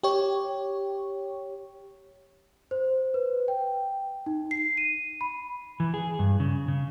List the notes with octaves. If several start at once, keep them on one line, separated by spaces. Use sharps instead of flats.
G4 C#5
C5
B4
G5
D#4
C7
D#7
B5
E3
G#4
G2
C#3
C#3